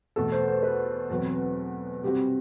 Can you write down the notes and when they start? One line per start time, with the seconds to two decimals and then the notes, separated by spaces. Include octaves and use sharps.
0.16 E2 B2 A3 A4
0.32 C5
0.48 C5
0.63 B4
1.10 E2 B2 F#3 C4
2.03 C3 G3 C4 F#4 G4